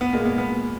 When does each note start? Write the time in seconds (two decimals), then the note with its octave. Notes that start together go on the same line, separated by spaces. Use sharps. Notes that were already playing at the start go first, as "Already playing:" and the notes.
0.01 B3
0.13 A#2 G#3 A#3
0.25 B3
0.38 B3